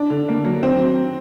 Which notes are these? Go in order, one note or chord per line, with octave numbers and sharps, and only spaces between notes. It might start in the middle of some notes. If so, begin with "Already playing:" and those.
Already playing: D4
D3
A#3
F#3
C4